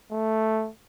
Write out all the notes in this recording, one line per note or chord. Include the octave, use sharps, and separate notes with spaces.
A3